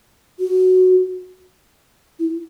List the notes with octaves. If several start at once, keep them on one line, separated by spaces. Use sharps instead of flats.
F#4
E4